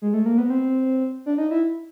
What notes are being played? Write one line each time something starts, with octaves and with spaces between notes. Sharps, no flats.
G#3
A3
A#3
B3
C4
D4
D#4
E4